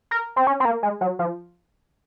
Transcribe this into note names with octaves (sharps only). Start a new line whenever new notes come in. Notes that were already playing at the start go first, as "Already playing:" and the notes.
A#4
C4
C#4
C4
A#3
G#3
F#3
F3